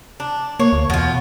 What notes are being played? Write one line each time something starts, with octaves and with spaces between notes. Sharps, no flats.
D4
A#3 C#5
D2
E2 B2 F4